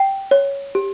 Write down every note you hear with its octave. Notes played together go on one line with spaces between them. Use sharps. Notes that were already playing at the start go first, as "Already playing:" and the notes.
Already playing: G5
C#5
G4